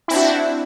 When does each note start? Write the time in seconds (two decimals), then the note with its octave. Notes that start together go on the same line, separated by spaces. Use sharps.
0.08 E4
0.11 C4
0.13 D4
0.16 F#4